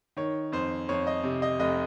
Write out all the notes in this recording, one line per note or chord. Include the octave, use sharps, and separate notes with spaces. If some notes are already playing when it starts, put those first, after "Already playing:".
D#3 C#5
F2 C5
F2 C#5
D#5
C3
D#5
F1 D#5